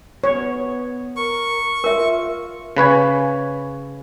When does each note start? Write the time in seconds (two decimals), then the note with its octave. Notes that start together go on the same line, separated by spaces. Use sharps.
0.24 B3 C#5
1.17 A#4 C#6
1.84 F4 A#4 E5
2.77 C#3 B4 C#5 G#5